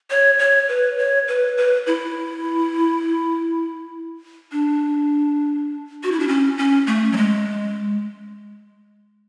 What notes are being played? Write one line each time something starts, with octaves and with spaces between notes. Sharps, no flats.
C#5
C#5
B4
C#5
B4
B4
E4
D4
F#4
E4
D4
C#4
C#4
A3
F#3
G#3